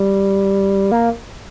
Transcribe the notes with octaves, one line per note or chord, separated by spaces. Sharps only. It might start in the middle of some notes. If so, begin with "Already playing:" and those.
Already playing: G3
A#3